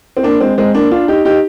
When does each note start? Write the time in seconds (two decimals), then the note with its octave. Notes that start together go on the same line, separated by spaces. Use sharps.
0.17 C4
0.23 A#3 D4
0.40 G#3 C4
0.58 G#3 C4
0.74 A#3 D4
0.91 D4 F4
1.08 D#4 G4
1.25 D#4 G4